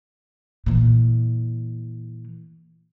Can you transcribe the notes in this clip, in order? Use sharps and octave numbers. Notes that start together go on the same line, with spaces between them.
A#2 E3